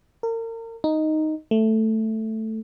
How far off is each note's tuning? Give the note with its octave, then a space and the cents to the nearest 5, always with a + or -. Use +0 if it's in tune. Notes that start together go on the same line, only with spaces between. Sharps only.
A#4 -35
D#4 +0
A3 +0